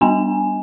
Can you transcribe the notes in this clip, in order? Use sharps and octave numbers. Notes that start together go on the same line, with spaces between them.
G3 B3 D4 G#5